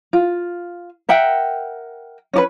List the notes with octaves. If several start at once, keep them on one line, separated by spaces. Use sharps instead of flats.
F4
A#4 E5 F#5 G5
C#4 G4 B4